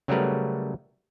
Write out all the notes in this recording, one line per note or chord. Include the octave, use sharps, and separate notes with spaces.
C#3 F#3 G3 A3 A#4 B4